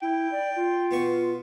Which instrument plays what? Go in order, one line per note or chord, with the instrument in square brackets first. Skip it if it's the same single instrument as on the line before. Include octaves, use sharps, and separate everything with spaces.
[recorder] E4 [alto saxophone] G5
[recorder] D5
F4
[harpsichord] B2 B3 C#6